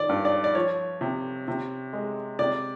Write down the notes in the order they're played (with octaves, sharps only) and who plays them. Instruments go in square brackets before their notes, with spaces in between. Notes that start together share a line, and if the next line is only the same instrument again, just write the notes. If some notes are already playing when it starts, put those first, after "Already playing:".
Already playing: [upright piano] D#3 D5
G2
D5
D5
F3 C#5
C3
C3
G#3
C3 D5